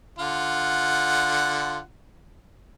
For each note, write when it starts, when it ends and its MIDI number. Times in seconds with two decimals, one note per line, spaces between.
0.19 1.80 50
0.19 1.80 65
0.19 1.80 78